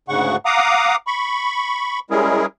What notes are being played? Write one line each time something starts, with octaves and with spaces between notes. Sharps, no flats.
D2 G#2 C#3 F#5 C#6
F5 F#5 A#5 D6 D#6
B5 C#6
G3 G#3 C#4 E4 G#4 A#4